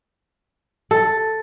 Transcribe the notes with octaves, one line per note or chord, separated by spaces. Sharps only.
A4